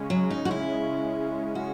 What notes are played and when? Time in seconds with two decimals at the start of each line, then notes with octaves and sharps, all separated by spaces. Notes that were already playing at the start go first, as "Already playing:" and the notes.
Already playing: C#3 G#3 C#4
0.10 F#3
0.30 D#4
0.45 F#4
0.51 E4
1.55 F#4